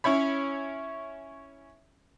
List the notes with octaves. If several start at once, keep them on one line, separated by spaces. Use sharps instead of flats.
C#4 E4 C#5 B5